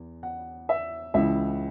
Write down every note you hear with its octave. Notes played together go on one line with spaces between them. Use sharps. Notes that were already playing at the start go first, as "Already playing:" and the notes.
Already playing: E2
F#5
E5
C#2 C#3 E3 E5